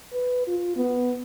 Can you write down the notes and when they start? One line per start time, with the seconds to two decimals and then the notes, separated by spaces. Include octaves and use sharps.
0.13 B4
0.48 F4
0.76 B3